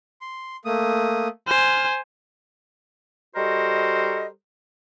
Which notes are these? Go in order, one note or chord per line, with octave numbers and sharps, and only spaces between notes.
C6
A3 A#3 D#6
C5 G#5 F6
G3 F#4 A4 A#4 C5 D#5